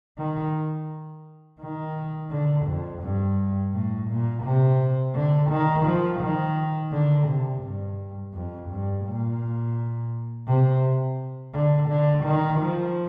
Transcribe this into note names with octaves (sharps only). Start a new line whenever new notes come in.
D#3
D#3
D3
F2
G2
A2
A#2
C3
D3
D#3
F3
D#3
D3
C3
G2
F2
G2
A#2
C3
D3
D3
D#3
F3